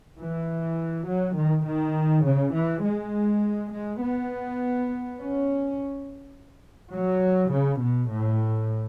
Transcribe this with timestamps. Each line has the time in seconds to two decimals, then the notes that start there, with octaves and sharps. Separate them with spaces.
0.18 E3
1.06 F#3
1.35 D#3
1.65 D#3
2.24 C#3
2.53 E3
2.82 G#3
3.71 G#3
4.00 B3
5.18 C#4
6.93 F#3
7.52 C#3
7.81 B2
8.11 A2